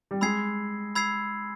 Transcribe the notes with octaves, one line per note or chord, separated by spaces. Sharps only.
G3
G#3 B5 E6 G#6 C7
B5 E6 G#6 C7